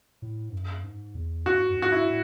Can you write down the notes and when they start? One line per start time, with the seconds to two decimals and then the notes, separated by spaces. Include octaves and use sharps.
0.22 A2
0.49 G#2
0.52 F#2
0.84 G#2
1.15 E2
1.46 G#2 F#4
1.70 F#2
1.77 G#2
1.82 F#4
1.92 E4
2.08 A2